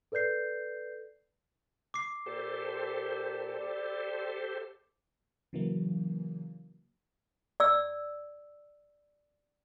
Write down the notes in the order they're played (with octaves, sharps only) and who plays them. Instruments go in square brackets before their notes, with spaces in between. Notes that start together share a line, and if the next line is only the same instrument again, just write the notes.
[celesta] A4 B4 D5 G6 C7
[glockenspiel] D6 C7
[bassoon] A#2 [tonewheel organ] G4 A4 C5
[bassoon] G3
[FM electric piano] C#3 E3 F#3 A#3
[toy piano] D5 E6